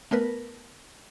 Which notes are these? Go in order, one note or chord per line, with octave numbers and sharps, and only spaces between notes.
A3 B3 A#4 B4